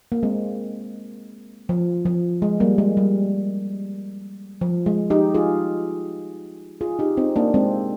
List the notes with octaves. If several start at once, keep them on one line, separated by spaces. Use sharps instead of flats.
A#3
G#3 C4
F3
F3
G#3
G3 A#3
G#3
G3
F3
G#3
D#4 G4
F4 G#4
F4 G#4
D#4 G4
C4 D#4
A#3 D4
G#3 C4